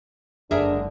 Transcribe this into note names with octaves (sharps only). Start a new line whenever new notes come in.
F#1 G#2 D3 D4 G#4 A#4 E5